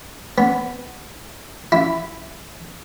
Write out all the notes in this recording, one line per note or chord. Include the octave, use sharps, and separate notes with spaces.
B3
E4